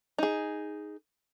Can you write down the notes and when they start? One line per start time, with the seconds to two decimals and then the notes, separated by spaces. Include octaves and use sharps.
0.18 D#4 G#4